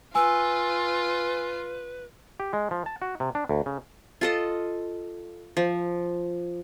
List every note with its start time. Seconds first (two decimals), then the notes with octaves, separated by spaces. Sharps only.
0.15 F4 B4 G#5 E6
2.40 G4
2.53 G#3
2.71 F3
2.86 A5
3.02 F#4
3.20 C3
3.35 D4
3.49 D2
3.66 C#3
4.21 F4 A4 D#5
5.57 F3